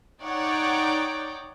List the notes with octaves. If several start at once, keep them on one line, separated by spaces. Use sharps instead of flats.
D#4 C#5 D5 F#5 G5 D6